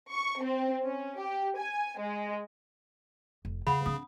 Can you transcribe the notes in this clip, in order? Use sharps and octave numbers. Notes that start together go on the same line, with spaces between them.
C#6
C4
C#4
G4
G#5
G#3
F1
E2 C#3 F#5 B5
C4 D4 D#6